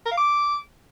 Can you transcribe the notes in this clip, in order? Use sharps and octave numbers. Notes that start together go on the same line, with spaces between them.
A#4
F5
D6